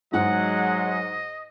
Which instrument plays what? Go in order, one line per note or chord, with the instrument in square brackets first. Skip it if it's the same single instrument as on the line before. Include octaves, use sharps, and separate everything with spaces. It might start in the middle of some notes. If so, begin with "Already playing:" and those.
[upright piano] G#2 [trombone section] F#3 G#3 [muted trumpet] D#5 [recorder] F#5